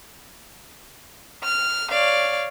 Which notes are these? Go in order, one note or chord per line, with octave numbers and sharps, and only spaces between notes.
F6
C#5 D5 F5